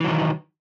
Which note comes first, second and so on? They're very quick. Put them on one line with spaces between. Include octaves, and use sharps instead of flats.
E3 F#3 D#3